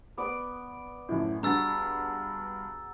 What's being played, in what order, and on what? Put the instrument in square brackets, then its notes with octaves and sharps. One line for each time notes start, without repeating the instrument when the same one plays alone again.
[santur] B3 D5 D6
[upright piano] F#2 A2
[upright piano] G2 [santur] F#4 G#4 [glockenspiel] A#5 E6 A6